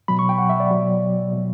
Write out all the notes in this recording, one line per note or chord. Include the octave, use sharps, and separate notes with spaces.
B2 F#3 B5
C#6
G5
F#5
E5
D5
B2 F#3
B2 F#3